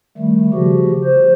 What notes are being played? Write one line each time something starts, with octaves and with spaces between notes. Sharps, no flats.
D#3 G3 A3
C#3 F3 F#4 G4
C5